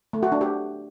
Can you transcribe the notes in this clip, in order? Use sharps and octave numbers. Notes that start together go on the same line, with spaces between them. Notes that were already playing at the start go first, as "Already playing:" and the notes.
A3
F#4
D4
G4